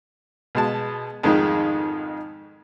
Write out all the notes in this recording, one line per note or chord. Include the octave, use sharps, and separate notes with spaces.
B2 G#3 A5
F2 G#2 D#3 G#3 D#4